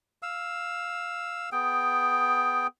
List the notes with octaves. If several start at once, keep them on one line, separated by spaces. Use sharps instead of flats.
F5 E6
B3 G#4 G5